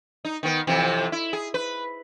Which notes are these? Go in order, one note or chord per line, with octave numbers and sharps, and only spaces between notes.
D#4
D#3 B3
F2 C3 E3
E4
G#4
B4